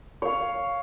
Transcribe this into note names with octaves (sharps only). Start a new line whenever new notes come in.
C#5 F5